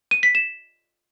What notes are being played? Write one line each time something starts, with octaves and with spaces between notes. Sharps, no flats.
D#7
B6
E7